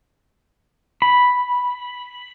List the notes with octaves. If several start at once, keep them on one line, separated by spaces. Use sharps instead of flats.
B5